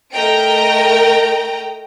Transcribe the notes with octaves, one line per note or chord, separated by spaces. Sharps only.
A3 A#4 D#5 G5 A#5 D7